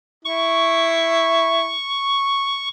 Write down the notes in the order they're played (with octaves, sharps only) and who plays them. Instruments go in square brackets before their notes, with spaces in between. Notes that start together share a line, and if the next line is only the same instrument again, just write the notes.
[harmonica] E4 [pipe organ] C#6